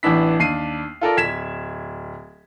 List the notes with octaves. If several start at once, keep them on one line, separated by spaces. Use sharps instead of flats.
A1 E3 B3 D4 E4 B6
D#2 D4 C7 D#7
F4 A4 A#4 D5
D1 G#6 B6 E7